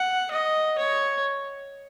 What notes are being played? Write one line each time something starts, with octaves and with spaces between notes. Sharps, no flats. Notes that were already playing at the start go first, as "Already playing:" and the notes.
Already playing: F#5
D#5
C#5